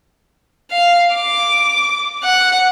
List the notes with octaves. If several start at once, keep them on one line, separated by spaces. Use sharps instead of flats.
F5
D6
F#5